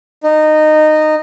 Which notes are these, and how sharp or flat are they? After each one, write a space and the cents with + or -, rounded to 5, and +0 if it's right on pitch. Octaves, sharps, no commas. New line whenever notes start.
D#4 -15